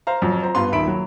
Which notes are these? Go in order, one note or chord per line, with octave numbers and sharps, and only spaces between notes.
C5 F5 A#5
F2 F3 F#3
C5 A#5
G2 B3 F4 C6
D#1 D#3 E5 B5 D7
F#3